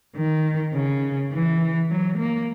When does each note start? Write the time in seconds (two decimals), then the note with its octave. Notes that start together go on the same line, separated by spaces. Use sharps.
0.16 D#3
0.74 C#3
1.32 E3
1.90 F#3
2.19 A#3